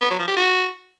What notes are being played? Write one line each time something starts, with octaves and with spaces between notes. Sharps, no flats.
B3
F#3
F3
G4
F#4